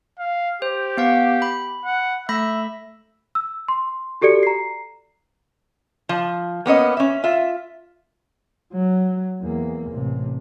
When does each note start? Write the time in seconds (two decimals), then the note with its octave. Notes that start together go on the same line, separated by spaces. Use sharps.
0.19 F5
0.62 G4 C5
0.97 B3 F5 F#5
1.42 B5
1.85 F#5
2.29 A3 E5 B5 A#6
3.35 E6
3.68 C6
4.21 F#4 G4 A4 D5 C#7
4.43 A#5 C7
6.09 F3
6.66 A#3 B3 C#4 D#5
6.97 C#4 E5
7.24 F4 E5
8.73 F#3
9.42 E2 A#3
9.91 A1 C3